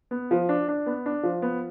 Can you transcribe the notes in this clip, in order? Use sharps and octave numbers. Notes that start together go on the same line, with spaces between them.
B3
F3
D4
D4
B3
D4
F3
B3